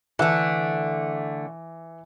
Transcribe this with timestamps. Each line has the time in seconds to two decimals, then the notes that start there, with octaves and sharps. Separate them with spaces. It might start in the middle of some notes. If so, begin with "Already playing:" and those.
0.19 D3 E3 A3 E5